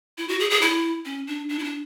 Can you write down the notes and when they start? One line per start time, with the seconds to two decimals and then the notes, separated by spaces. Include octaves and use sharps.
0.18 E4
0.29 F#4
0.40 G#4
0.50 G#4
0.61 E4
1.05 C#4
1.27 D4
1.49 D4
1.59 E4
1.64 D4